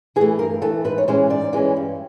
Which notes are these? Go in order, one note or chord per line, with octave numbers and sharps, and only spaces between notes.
E3 G#4
A3
G2 A#4
E3 A3 A4
G#2 B4
C#5
E3 G#3 C#4 C5
G#2 D5
E3 G#3 C#4
G2